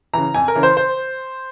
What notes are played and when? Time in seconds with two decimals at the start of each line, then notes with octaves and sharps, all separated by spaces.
0.13 C#3 E3 A#5
0.34 F2 G#5
0.48 A#4
0.55 C#3 E3
0.63 C5
0.77 C5